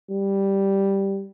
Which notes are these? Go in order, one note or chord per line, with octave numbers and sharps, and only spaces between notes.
G3